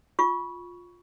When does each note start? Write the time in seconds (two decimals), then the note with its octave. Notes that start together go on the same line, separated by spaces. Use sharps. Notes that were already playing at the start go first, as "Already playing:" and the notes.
0.19 F4 C#6